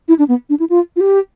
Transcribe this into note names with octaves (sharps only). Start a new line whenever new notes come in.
E4
D4
B3
D4
E4
F4
F4
G4